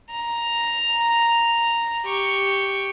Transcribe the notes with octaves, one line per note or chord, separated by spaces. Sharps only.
A#5
G4 C#6